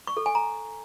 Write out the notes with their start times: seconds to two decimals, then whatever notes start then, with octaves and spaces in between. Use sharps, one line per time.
0.07 C#6
0.17 A4
0.26 G#5
0.35 A#5